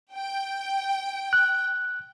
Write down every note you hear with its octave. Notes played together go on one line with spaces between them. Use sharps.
G5
F#6